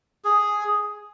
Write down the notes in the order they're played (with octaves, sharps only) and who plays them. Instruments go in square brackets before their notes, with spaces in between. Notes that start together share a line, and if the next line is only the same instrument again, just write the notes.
[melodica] G#4